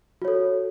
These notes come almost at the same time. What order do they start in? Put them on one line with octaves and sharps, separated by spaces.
F#4 C#5 A4